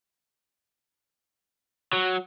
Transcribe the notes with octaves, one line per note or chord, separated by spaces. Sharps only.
F#3